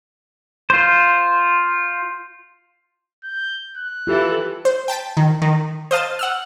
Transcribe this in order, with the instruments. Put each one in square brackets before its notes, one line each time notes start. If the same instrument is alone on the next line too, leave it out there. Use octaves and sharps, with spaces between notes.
[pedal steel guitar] F4 C5
[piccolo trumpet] G6
F#6
[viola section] E3 A4 [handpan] F4 G4
[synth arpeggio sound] C5
G5 A5 B6 D7
D#3
D#3
C5 D#5 F5 A5 A6
F#5 E6 F6